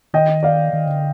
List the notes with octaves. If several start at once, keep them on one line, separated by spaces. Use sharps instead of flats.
D#3 D#5 G5
D5 F5
D#3
D3